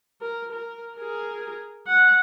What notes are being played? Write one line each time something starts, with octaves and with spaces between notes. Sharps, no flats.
A#4
A#4
G#4 A#4
F#5